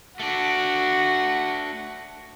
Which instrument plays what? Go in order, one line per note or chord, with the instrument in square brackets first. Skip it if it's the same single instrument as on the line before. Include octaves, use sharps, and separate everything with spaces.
[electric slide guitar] A3 D4 [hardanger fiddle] F#4